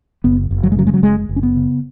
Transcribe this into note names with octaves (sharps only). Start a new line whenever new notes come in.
F#1 B3
F#1
F#3
G#3
C#3 F#3
G#3
F#3
F#1 G#3
F#1
C#4
B3
C#3